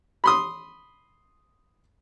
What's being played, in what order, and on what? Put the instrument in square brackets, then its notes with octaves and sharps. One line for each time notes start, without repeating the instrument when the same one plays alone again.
[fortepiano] B5 C6 D#6